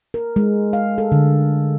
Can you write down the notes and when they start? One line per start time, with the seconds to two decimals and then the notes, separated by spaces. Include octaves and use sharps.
0.14 A#4
0.36 G#3
0.73 F5
0.98 A4
1.12 D3